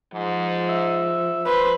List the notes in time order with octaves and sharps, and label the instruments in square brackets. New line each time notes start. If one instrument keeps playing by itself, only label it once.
[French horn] G#2 [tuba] F3
[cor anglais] E5
[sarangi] B4 [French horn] C5